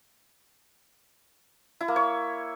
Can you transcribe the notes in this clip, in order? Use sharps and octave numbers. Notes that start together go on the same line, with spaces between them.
E4
A#3
C#5